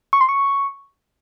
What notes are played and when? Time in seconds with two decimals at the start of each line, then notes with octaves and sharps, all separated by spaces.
0.13 C#6
0.21 C6
0.29 C#6